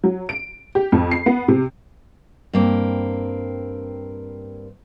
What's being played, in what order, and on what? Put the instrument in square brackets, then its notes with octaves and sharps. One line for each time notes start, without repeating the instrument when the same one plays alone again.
[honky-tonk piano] F#3
D7
G4
F2
C7
B3
C3
[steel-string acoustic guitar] G2 A#3 C4